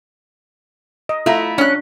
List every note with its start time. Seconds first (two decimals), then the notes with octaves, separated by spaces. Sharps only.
1.09 D#5
1.26 A3 E4 F4 A#5
1.58 C#4 D4 F#6